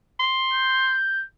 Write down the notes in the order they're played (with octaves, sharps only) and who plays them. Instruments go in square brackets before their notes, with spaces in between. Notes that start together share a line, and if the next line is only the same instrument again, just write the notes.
[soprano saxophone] C6
[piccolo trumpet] G6